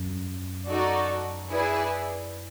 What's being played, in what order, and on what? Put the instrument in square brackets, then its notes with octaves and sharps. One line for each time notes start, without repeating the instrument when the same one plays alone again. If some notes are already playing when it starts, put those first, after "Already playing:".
Already playing: [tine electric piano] F#2
[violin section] D#4 F#4 A4 D5
E4 G#4 B4 D5